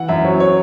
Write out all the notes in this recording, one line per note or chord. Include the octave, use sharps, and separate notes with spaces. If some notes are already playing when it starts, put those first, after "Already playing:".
Already playing: E3 F#5
F#2 E5
F#3 C#5
C#5